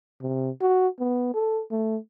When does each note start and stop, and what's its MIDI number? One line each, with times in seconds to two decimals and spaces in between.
0.22 0.50 48
0.61 0.88 66
1.00 1.31 59
1.34 1.62 69
1.71 1.97 57